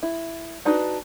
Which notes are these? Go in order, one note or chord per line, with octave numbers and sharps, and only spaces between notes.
E4
D4 D#4 F#4 B4